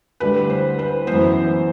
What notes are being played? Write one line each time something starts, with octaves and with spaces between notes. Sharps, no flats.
D2 D3 G3 B4
C5
B4
F#2 E3 B3 C5